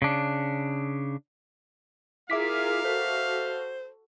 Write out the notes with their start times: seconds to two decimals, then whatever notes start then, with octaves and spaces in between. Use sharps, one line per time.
0.02 C#3 D4
2.30 E4 F4 G#4 A#4 E5 F5 D6 B6
2.85 F#4 A4 C5